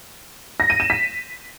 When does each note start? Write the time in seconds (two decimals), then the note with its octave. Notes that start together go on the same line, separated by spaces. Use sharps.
0.60 A#6
0.70 D#7
0.80 E7
0.90 B6